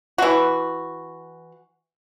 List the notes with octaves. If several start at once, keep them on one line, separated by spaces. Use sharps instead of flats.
E3 F#4